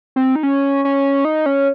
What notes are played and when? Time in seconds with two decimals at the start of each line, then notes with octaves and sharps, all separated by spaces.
0.16 C4
0.36 D#4
0.43 C#4
0.85 C#4
1.25 D#4
1.46 C#4